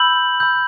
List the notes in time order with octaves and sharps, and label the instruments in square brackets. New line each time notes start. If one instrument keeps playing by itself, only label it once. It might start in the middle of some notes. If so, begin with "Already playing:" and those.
Already playing: [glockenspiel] B5 E6 G6 F#7
B5 E6 G6